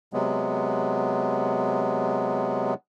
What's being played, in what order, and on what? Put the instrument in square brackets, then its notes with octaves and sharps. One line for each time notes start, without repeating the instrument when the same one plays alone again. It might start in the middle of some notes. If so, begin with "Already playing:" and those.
[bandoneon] C3 F#3 G#3 B3